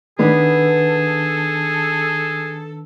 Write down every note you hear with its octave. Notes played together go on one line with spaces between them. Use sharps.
D#3 B3 D4 G#4 A4 B4